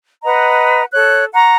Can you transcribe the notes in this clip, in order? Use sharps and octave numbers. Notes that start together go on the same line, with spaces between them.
B4 D#5 F#5 A#5
A4 C#5 F#6
F#5 A#5 C#6